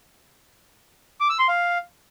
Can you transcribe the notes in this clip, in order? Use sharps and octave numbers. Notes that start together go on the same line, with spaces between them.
D6
E6
C6
F5